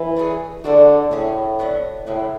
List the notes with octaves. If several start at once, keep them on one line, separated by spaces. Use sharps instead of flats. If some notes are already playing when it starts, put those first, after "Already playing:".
Already playing: E3
F#3 A3 D4 G#4
D3 G#3 D4 F#4
A2 C#3 F#3 C#4 G#4
D3 F#3 B3 D4
A2 C#3 E3 G#3